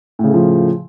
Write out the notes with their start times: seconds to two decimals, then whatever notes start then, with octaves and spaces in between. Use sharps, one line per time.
0.19 A2
0.24 C#3
0.29 A3
0.34 F3